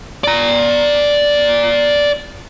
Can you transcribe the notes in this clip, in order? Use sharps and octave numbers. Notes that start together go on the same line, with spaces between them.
D5 A#5